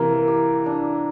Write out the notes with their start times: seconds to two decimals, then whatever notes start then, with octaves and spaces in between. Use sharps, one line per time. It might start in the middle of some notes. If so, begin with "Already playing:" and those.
Already playing: C3 E3 A#3 A#4
0.28 G4
0.66 D4